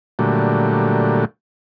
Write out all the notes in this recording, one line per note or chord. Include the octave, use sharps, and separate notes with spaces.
A#2 D3 F#3 G3 A3